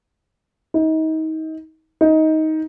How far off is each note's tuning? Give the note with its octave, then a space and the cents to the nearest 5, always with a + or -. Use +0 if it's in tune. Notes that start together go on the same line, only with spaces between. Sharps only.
D#4 +30
D#4 +15